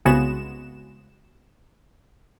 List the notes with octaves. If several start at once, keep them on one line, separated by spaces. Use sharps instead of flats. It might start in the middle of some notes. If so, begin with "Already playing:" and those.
C2 C#3 G#3 B3 F#4 E7